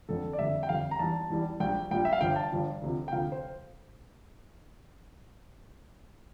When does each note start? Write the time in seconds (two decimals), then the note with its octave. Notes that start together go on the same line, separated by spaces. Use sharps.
0.09 G1 F2 D3 A4
0.33 D5
0.39 G1 F2 D3 G3 E5
0.63 G5
0.69 G1 F2 D3 G3 F5
0.91 A#5
0.99 E2 E3 G3 A5
1.30 E2 E3 G3
1.60 A#1 A#2 G3 G5
1.91 A#1 A#2 G3 G5
2.05 E5
2.13 F5
2.21 G1 G2 F3 G5
2.36 A5
2.52 G1 G2 F3
2.82 D2 C3 F3
3.08 G5
3.12 D2 C3 F3 F5
3.32 C5